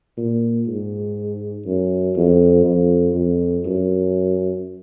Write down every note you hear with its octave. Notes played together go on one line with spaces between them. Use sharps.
A#2
G#2
F#2
F2
F2
F2
F#2